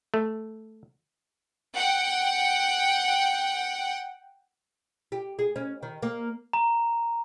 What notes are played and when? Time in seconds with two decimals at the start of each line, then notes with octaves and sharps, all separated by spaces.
0.14 A3
1.76 F#5 G5
5.12 G4
5.39 G#4
5.56 C#4
5.83 D#3
6.02 A#3
6.53 A#5